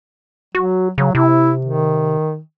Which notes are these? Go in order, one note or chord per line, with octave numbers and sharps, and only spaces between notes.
F#3 F#4
C#3 F#3
C3 E4
D#3